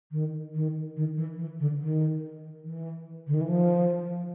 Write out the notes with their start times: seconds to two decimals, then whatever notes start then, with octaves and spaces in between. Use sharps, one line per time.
0.12 D#3
0.55 D#3
0.97 D#3
1.17 E3
1.38 E3
1.60 D3
1.81 D#3
2.64 E3
3.27 D3
3.34 D#3
3.41 E3
3.48 F3